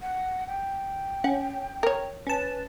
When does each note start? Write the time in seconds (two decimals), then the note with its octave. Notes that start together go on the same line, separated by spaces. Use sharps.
0.01 F#5
0.48 G5
1.24 C#4 F#5
1.83 A#4 C#5
2.27 C#4 B4 A5